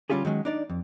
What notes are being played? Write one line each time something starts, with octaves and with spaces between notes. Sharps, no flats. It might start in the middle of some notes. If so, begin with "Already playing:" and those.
D3 G3 C#4 F4 G4 G#4
D#3 F#3 G#3 C#4
D4 D#4 D5
F2